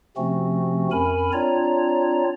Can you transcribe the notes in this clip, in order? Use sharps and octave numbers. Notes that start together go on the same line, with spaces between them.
C3 F3 A3 C4 C#4 F#4
F2 C#4 A#4 G#5 B5
C4 D4 F4 C#5 D5 A#5